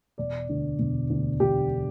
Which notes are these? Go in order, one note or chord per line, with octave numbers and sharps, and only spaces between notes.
E1 D5
D2 D3
E1
D2 D3
E1 G4
D3